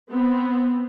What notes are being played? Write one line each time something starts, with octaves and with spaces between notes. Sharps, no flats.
B3 C4